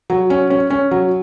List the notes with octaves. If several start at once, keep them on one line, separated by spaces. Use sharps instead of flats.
F#3
C#4
C#4
C#4
F#3